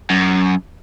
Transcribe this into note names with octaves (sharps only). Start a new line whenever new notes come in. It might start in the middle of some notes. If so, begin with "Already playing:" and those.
F#2